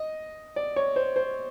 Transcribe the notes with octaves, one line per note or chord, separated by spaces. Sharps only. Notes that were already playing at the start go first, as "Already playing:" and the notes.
Already playing: D#5
D5
C#5
C5
C5